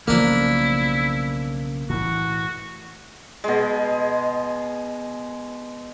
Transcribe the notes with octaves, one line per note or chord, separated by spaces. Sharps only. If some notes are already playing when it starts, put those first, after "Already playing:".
B1 C#3 F3 A3 A#3 D4 E4
A2 E3 F#4
B2 G#3